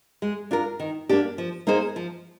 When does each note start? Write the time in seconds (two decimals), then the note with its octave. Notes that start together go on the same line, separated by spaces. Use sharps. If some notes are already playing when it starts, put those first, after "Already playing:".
0.22 G#3
0.51 D4 F4 A#4
0.79 D#3
1.09 A#3 D4 G4
1.38 F3
1.67 A#3 D#4 G#4 C5
1.96 F3